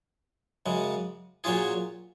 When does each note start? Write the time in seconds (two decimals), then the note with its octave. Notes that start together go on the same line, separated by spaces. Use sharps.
0.66 F#2 C#3 G#3
1.44 A#2 F#3 C#4 F4 G#4